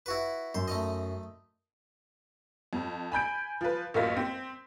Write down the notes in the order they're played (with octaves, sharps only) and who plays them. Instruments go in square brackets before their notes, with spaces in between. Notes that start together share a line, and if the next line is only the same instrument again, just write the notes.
[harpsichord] E4 F#4 B4
[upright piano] F#2 [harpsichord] C5
[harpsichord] A3 D#4 D#5
[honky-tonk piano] F2
G#5 B5 G6 D7
F3 B4
A1 F#2 A#3 F4 D#5 B6
C4